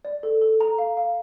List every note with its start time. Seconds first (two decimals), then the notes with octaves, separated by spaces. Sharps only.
0.05 D5
0.23 A4
0.41 A4
0.60 A#5
0.78 F5
0.97 F5